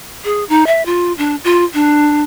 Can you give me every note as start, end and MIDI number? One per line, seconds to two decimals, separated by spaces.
0.24 0.44 68
0.49 0.64 63
0.67 0.83 76
0.86 1.13 65
1.18 1.36 62
1.44 1.64 65
1.74 2.23 62